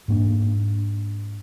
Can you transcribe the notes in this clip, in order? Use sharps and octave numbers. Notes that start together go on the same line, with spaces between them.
G#2 A#3 D4